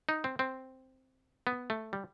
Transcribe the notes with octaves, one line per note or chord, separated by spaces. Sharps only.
D#4
C4
C4
B3
A3
G3